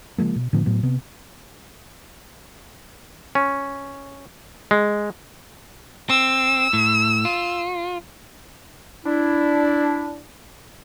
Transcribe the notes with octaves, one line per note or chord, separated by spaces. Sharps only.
C#3 F3 G#3 A#3
B2
A2 D3 F3 B3
A2 F#3 B3
C3 B3
C#4
G#3
C4 E6
A2
F4
D4 E4